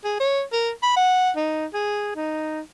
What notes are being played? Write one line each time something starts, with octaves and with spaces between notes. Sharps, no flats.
G#4
C#5
A#4
B5
F#5
D#4
G#4
D#4